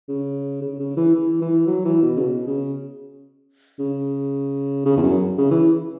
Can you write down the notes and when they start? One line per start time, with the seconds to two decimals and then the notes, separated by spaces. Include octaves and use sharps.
0.08 C#3
0.62 C#3
0.79 C#3
0.97 E3
1.14 E3
1.41 E3
1.67 F#3
1.85 E3
2.02 B2
2.17 C#3
2.20 B2
2.47 C#3
3.79 C#3
4.85 C#3
4.97 E2
5.03 F#2
5.38 C#3
5.51 E3